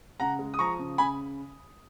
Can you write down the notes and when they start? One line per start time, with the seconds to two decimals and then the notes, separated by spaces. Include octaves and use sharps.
0.20 C#3 F#5 A#5
0.39 G#3
0.54 D#6
0.59 F3 A#5 C#6
0.79 C#3
0.98 C#3 G#5 B5